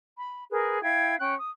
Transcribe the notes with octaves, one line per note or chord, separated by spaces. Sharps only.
B5
G#4 A#4 B4
E4 F5 G5 G#6
C#4 G5 F#6
D#6